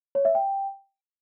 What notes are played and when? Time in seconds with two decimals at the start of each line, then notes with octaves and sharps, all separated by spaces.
0.15 C#5
0.25 E5
0.35 G5